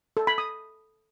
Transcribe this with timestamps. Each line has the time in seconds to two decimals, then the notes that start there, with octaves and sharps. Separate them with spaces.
0.17 A4
0.27 B5
0.38 D#6